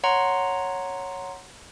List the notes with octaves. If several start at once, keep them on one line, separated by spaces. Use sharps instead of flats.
C#5 F#5 A#5 C6